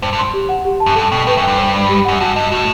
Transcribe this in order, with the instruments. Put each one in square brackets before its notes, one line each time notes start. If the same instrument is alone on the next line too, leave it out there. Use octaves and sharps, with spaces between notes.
[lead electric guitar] G2 [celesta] C5
[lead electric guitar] G2
[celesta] C6
G4
F#5
G4
A5
[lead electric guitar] F#2
[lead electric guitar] G2 [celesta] A4
[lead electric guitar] B2 [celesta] G5
[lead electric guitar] A2 [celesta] B4
[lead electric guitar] F#2
[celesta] G5
[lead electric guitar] G2
[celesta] C5
B5
G4
[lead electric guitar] F#2 [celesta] F#5
[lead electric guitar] G2 [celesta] F#4
[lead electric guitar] G2 [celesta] D#5
[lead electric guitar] A2 [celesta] F#4